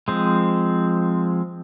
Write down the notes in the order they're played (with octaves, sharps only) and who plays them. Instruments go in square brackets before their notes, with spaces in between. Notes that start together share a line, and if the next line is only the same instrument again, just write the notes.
[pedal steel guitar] F3 G#3 C4